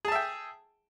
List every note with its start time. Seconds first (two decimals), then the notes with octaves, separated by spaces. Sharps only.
0.05 G#4
0.08 A5
0.12 E5
0.15 G5